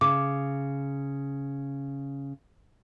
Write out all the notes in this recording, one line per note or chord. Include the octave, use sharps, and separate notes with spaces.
C#3 D6